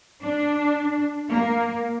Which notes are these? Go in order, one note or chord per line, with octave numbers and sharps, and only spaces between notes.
D4
A#3